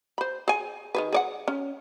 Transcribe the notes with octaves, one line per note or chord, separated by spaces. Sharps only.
C5 B5
G#4 G#5
D#3 G#4 B4
G#4 D5 F#5
C#4